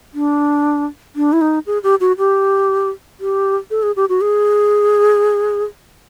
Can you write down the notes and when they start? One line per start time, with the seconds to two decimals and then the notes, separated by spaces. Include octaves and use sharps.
0.14 D4
1.16 D4
1.33 E4
1.41 D#4
1.67 G#4
1.83 G4
2.00 F#4
2.18 G4
3.20 G4
3.71 A4
3.83 G#4
3.96 G4
4.09 F#4
4.21 G#4